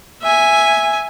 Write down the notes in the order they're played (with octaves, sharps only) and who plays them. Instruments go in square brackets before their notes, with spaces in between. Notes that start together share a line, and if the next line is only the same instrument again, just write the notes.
[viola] E5 G#5